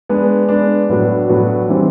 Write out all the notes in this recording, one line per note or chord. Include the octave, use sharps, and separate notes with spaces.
G#3 B3 D4
G#3 B3 D4
A2 F#3 B3 D4 F#4
A2 F#3 B3 D4 F#4
E3 G3 C4 D#4